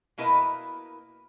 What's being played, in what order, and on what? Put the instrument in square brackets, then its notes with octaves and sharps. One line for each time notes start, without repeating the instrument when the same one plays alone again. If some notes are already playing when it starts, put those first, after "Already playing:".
[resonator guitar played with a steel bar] B2 A#3 E4 A#4 B4 D#5